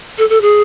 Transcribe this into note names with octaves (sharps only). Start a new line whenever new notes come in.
A4
A4
G#4